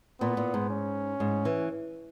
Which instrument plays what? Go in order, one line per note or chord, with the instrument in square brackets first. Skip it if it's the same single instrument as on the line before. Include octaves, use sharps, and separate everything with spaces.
[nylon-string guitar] A#2 [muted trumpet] B3
[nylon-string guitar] A#2
G#2
[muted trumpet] C#4
[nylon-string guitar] G#2
E3